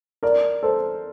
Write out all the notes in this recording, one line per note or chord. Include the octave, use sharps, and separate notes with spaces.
A#4 D5
A4 C5